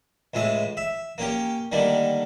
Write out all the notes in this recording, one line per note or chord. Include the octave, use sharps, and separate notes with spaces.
C#2 A2 G#3 E5
E5
A#3 C#4 G4
D3 D#3 G3 A3 A#3